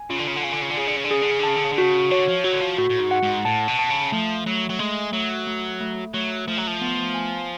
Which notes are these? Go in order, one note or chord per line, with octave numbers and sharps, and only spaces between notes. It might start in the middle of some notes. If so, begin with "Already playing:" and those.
Already playing: G#5
C#3 F4
D3
C#3
D3
C#3 G#5
D3
C#3
D3
C#3 G#4
D3
C#3
D3
C#3 G#4
D3
C#3
D3
C#3 A5
D3
C#3
D3
C#3 F#4
D3 C#5
F3
F#3 F#4
D3
F3
A2 F#4
A2
G#2
F#5
G#2
A2 A5
B2
A5
C#3
F3 A3
F#3 A3
F#3
G#3 A3
F#3 A3
A3
A3
F#3 A3
F3 A3
F#3
F3
B3
G#5